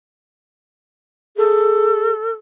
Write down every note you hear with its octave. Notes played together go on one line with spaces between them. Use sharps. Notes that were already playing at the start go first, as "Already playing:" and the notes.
G#4 A4